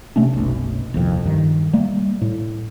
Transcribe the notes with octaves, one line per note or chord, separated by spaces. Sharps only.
C3 A3 C#4 D4
F#1 B1
D#1 C2 F2
G2 D#3
G3 A3 A#3
A2